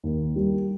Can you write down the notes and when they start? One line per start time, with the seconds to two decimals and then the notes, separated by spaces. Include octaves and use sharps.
0.04 D#2
0.36 G3